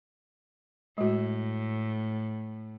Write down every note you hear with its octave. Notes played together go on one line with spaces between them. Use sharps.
A2 G#3 F#4